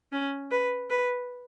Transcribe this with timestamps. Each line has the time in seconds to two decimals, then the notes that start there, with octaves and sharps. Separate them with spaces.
0.12 C#4
0.51 B4
0.90 B4